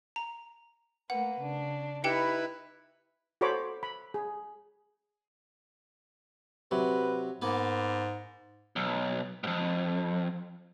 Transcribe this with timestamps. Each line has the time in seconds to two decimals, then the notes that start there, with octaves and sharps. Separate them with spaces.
0.16 A#5
1.10 A3 A#3 B4 F#5
1.40 C#3 D4
2.04 D#4 E4 G4 B4 G5 C#7
3.41 F#4 A4 C5 C#5 B5 D6
3.83 B5
4.14 G#4
6.71 C3 F#3 B4
7.42 G#2 A#3 B3 B4
8.76 B1
9.44 F2 G#2